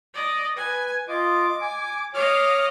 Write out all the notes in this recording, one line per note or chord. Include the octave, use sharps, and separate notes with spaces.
D5 D#5
B4 G#5
F4 D#5 D6
G#5
C#5 D#5 F5 D6 F6